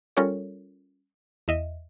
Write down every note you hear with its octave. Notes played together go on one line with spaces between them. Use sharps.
G3 C#4 F4 A4 A#4 C#5
E2 D#5 E5